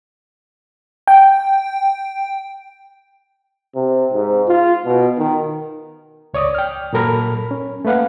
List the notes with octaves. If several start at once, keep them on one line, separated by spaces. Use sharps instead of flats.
G5
C3
G#2
F4
B2
D#3
C#2 C#5 D5 D#6
G5 F6
A#2 F#3 A4 A#4 B5 F6
C#4
A3 A#3 B4 F5 F#5